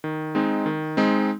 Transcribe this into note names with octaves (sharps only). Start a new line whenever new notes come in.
D#3
G#3 C4 D#4
D#3
G#3 C4 D#4